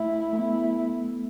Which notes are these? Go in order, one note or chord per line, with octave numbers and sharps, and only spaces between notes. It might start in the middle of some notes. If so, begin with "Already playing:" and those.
Already playing: A3 E4
A3
B3 E4